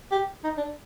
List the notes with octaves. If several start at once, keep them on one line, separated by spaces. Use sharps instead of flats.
G4
D#4
D4